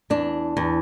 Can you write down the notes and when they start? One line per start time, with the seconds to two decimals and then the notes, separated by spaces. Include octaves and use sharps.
0.10 E2 D4
0.57 E2